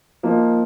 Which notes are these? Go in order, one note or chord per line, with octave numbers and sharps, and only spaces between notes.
F3 A#3 D#4